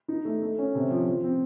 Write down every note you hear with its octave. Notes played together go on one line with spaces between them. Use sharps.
D#4
A3
A3
C#4
C3
F3
F3
C4